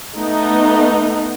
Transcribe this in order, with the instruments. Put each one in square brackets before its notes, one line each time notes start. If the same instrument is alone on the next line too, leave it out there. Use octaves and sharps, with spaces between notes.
[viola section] A3 B3 D#4